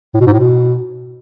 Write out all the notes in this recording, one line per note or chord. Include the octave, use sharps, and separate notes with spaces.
A2
B2
G#2
A2
B2